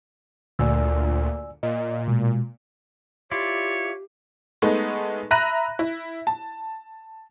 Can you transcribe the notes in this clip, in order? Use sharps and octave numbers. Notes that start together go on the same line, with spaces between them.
D2 A#2 D5 G#5 E6
A#2 D#5
B2 G#3
E4 F4 G4 C#5 D5
G#3 A3 B3 D#4
E5 A#5 B5 F#6 A#6 D#7
E4
A5